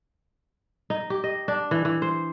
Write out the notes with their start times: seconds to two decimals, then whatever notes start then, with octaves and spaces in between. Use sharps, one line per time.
0.90 D#4
1.10 G4
1.24 D#5
1.48 D4
1.71 E3
1.85 E3
2.02 C5